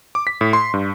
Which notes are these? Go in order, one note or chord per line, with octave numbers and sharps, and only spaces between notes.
D6
B6
A2
C6
G2